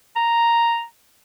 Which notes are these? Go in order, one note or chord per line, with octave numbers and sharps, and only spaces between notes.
A#5